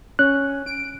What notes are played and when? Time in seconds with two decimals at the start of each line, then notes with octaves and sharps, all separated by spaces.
0.19 C#4 F#6
0.66 D7